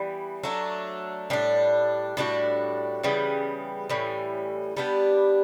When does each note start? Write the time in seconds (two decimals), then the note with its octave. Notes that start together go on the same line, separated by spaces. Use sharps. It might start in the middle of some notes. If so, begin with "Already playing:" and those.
Already playing: E3 G3 B3
0.43 F#3 A3 D4
1.30 A2 G3 D4
2.17 A2 G3 D4 F#4
3.03 C#3 E3 G3 B3
3.89 A2 E3 G3 C#4
4.77 G3 B3 D4 G4